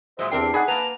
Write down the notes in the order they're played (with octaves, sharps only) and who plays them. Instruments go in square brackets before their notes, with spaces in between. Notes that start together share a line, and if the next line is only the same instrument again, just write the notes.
[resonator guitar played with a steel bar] A#2 F#3 G#3 [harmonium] C5 D#5 E5
[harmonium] E2 C3 D4 [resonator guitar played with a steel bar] C4 A#4 G5 [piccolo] C7
[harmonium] D#4 D5 [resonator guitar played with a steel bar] G#4 [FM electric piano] F#5 G#5 B5
[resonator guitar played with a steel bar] A#3 B4 [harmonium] A5 A#5 [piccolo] F7